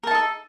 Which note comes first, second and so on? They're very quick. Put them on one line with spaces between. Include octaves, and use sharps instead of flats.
A#4 A5 D#4 A4